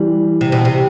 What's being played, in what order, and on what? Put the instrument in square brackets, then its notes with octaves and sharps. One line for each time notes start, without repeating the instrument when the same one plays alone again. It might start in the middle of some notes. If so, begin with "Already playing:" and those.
Already playing: [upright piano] E3 G3
[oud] C3
B2
C3